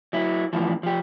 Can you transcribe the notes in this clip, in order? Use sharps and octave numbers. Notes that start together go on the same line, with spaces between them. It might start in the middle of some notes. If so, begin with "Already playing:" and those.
F#3 E4
A2 E3 F3
F3 G4